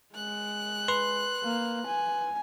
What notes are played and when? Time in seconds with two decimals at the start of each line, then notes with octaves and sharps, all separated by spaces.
0.15 G#3 F#6
0.88 B4 C6
1.43 A#3
1.87 G#5